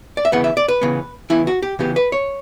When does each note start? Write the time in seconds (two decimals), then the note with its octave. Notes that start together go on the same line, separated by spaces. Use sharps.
0.17 D5
0.25 E5
0.32 C#3 E3 B3 F#5
0.44 E5
0.57 D5
0.68 B4
0.82 C#3 E3 B3
1.30 C#3 E3 B3 E4
1.47 F#4
1.62 G4
1.79 C#3 E3 B3 G4
1.96 B4
2.12 C#5